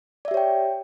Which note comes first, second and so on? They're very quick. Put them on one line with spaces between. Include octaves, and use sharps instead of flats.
D5 E5 G4 C#5 G5